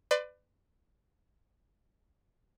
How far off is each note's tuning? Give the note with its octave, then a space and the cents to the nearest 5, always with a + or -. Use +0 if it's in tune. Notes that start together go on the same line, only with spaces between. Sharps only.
B4 +30 D5 +25 C6 +5